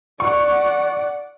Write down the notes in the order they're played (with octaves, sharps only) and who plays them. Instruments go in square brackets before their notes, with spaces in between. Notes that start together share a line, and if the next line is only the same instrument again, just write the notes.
[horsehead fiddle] D5 F#5 [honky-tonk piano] C#6